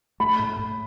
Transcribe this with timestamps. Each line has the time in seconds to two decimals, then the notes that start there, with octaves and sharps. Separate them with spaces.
0.20 A3 B5
0.39 A2
0.59 A2